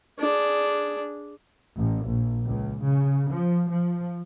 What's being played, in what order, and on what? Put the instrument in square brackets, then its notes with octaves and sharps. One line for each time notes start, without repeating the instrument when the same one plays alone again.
[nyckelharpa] D4 G#4
[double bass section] A1
A#1
C#2
C#3
F3
F3